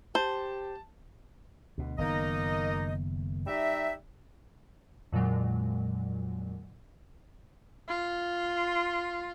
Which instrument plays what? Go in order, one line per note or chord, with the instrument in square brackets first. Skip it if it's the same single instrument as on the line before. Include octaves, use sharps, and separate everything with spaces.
[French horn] G4 [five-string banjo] C5 [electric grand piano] A5
[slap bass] D2 B2
[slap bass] F#1 D#3 B3 [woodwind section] A#3 D#4 D#5
[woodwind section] G3 D#4 E5
[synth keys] F2 A#2 D3 F#3 G#3
[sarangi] F4